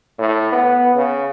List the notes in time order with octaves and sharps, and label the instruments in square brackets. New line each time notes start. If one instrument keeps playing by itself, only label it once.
[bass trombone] A2
B3
C#3